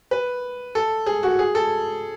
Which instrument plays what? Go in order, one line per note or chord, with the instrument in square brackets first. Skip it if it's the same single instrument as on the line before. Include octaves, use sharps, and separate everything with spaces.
[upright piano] B4
A4
G#4
F#4
G#4
A4